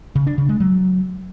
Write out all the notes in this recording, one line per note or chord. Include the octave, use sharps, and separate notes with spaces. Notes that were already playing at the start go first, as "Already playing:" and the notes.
C#3
D4
C#3
G#3
F#3